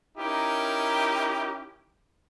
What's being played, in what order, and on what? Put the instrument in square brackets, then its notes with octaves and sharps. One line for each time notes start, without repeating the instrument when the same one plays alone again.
[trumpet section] C#4 D#4 E4 G4 A#4